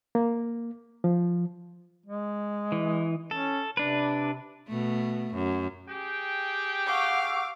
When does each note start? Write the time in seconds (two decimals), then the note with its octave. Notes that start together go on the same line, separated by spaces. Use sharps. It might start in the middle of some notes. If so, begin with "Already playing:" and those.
0.15 A#3
1.04 F3
2.06 G#3
2.72 E3
3.31 C#4 A4
3.77 C3 D4 B4
4.68 B2 A3
5.34 F#2
5.88 G4 G#4 G5
6.87 F5 F#5 C#6 D6 E6